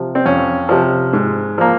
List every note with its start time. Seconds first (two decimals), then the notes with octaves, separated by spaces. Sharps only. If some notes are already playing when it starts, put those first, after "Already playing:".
Already playing: C3 F3
0.15 C4
0.26 F2 C#4
0.69 C3 F3
1.13 G#2
1.58 F3 A#3